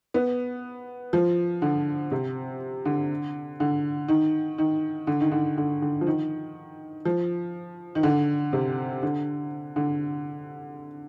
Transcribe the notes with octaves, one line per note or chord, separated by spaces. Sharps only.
B3
F3
D3
C3
D3
D3
D#3
D#3
D3
D#3
D3
D3
D3
F3
D#3
F3
D#3
D3
C3
D3
D3